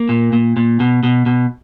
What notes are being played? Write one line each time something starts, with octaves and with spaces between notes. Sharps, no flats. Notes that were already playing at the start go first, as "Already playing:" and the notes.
Already playing: A#3
A#2
A#2
A#2
B2
B2
B2